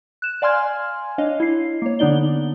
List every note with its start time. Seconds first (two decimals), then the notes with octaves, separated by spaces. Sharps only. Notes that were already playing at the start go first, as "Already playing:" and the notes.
0.22 F#6 E7
0.42 D5 F5 G#5 C6 F6 G#6
1.18 D4 C#5 D#5 F5
1.40 E4 C7
1.82 A#3 C#5
1.99 D3 B3 D4 D#4 D5 G7